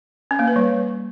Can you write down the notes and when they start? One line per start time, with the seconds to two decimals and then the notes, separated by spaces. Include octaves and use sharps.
0.31 C#4
0.39 A#3
0.48 B4
0.56 G3